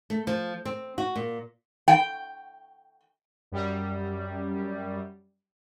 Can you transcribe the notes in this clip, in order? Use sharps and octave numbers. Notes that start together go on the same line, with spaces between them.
A3
F3
C4
F#4
A#2
G5
F#2 G3